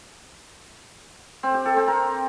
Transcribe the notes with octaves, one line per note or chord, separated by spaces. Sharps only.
C4
G4
A4
C4
A#4